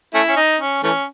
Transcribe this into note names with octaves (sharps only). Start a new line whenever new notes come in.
A3 C#4 E4
C#4
D#4
C#4
E3 A3 C#4